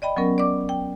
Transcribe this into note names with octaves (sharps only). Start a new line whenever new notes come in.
D5 D#5 G5 B5
F#3 B3 C#4 A#4
D5 D6
G5